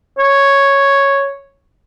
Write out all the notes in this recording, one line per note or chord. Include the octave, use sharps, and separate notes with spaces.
C#5